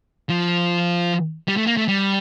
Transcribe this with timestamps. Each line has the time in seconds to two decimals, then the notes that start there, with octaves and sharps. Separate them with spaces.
0.29 F3
1.48 G3
1.57 A3
1.67 A#3
1.77 A3
1.88 G3